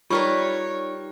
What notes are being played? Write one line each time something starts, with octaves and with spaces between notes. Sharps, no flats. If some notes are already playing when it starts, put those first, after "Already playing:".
G3 D#4 F4 A#4 B4 C#5 D5 C#6